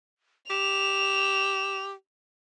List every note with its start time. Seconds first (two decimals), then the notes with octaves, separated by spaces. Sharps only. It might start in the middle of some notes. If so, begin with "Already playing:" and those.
0.50 G4 E7 F7